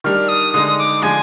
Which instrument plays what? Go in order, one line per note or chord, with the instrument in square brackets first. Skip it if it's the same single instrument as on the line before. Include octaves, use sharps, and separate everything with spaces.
[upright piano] D#3 G3 D4 [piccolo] F6
[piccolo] D#6
[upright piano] D3 G#3 D#4 [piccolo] D#6
[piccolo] D#6
D6
[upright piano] D3 F3 G#3 [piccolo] G#5